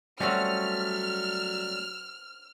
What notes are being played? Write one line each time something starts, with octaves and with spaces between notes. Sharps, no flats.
F#3 G3 A3 C4 C#4 F#4 C#5 F6